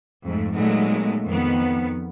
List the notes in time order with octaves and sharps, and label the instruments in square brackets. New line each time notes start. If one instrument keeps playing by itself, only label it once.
[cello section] F2 G#2 A3
A#2 F#3 G#3 A3 B3 D#4
F2 D#3 F3 B3